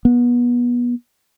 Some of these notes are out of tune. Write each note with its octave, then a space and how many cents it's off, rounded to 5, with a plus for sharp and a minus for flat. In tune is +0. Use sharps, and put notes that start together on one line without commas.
B3 -25